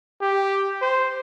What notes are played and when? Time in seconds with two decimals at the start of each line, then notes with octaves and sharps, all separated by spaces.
0.22 G4
0.82 C5